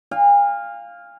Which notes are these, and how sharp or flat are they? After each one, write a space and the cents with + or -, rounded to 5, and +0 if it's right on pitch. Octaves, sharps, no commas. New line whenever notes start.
F5 +0 G#5 -40